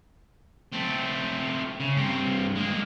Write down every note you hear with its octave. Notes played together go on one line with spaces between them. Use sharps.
A3 C4
C#3
G2 C4
G#3 A#3